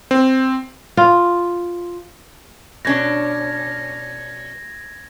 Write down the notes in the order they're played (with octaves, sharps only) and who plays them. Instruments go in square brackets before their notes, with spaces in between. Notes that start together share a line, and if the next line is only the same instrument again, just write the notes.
[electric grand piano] C4
[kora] F4
[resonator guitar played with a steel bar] B2 C#4 D4 [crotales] G#6 A#6